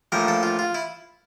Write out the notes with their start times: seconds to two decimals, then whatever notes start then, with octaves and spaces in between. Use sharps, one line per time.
0.12 A#1 A2 F3 A#4
0.28 A4
0.43 F4
0.59 F4
0.74 E4